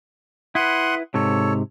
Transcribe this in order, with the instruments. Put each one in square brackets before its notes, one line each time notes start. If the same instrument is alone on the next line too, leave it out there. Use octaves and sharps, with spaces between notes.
[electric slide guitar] E4 B4 [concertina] F#5 C6 D#6
[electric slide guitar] G#2 C3 [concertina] A4 C#5